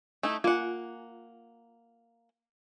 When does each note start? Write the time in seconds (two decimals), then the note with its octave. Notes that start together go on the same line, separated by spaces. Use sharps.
0.23 A3 D#4 E4
0.44 A#3 F4 F#5 G#5